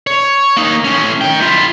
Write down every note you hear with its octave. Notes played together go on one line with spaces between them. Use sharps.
C#5
A#3 D#4
A2 C#4
D#3 G5
E4 F4